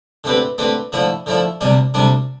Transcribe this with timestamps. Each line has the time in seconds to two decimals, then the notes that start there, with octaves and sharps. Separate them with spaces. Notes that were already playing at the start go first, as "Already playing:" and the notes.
0.24 D3 A3 C4 G4 B4
0.58 D3 A3 C4 G4 B4
0.92 D3 F3 A3 E4
1.26 D3 F3 A3 E4
1.61 D2 C3 G3 D4
1.94 D2 C3 G3 D4